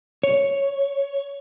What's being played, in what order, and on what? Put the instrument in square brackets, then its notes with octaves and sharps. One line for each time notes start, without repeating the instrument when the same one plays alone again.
[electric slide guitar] C#5